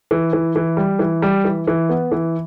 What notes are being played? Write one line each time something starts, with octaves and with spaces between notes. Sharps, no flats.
E3
E3
E3
G3
E3
G3
E3
E3
B3
E3